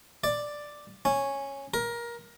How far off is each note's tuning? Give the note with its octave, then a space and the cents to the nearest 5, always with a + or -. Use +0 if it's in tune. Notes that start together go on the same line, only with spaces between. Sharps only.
D5 +5
C#4 -5
A#4 +20